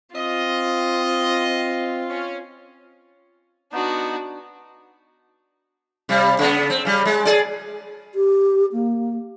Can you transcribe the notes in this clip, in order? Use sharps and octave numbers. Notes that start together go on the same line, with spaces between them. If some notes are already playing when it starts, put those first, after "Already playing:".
C4 F4 D#5
C#4
B3 D4 D#4 F#4
C3 G3
C#3 B3
C4
C#3 G3
G#3
G#4 D5
G4
A#3